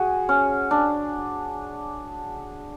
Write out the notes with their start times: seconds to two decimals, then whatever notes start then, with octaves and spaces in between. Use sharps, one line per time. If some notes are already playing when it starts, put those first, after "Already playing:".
Already playing: F#4 G#4
0.29 C#4
0.71 D4